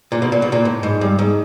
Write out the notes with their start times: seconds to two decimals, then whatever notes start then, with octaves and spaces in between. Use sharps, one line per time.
0.12 A#2
0.22 B2
0.32 A#2
0.42 B2
0.52 A#2
0.65 A2
0.83 G#2
1.01 G2
1.19 G#2